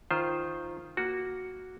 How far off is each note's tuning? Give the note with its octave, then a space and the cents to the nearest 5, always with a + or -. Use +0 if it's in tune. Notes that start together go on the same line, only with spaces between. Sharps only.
D#3 +0 F4 -10 C5 +0
A#3 +0 F#4 +0